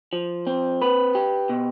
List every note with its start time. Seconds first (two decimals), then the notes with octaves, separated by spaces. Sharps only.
0.13 F3
0.47 C4
0.82 B4
1.15 G4
1.49 B2